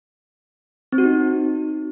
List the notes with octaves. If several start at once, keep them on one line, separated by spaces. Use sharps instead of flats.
C4
F#4
D#4